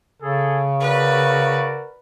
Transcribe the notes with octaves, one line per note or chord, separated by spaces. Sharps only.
C#3 G#4 A4
F#4 A#4 B4 D5